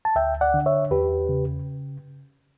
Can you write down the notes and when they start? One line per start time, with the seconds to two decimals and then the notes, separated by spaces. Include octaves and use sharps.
0.05 A5
0.15 D2 E5 G5
0.41 D5 F#5
0.54 D3
0.66 C#5 E5
0.91 E2 G4 B4
1.29 C#3